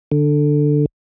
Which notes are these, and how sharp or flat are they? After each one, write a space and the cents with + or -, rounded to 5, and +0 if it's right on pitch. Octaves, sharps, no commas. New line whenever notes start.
D3 +10